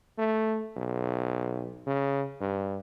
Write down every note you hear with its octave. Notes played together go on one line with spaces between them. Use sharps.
A3
B1
C#3
G2